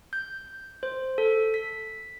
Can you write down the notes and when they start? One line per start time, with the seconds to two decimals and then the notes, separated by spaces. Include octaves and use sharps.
0.13 G6
0.83 C5
1.18 A4
1.54 B6